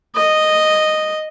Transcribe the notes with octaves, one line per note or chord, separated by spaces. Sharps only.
D#5